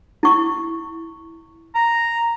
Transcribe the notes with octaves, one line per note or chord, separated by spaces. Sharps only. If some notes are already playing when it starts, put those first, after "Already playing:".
E4 C#6
A#5